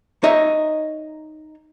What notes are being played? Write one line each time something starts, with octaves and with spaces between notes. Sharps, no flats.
D#4 C#5 D#5 E5